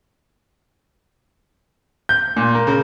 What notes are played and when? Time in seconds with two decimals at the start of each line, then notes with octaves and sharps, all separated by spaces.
2.09 G6
2.36 A#2
2.55 A#3
2.67 C#3